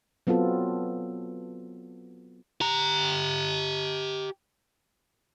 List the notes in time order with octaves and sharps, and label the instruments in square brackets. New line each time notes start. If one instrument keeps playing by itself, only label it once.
[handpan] F#3 B3 C4 F4 A4
[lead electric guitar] G4 A#5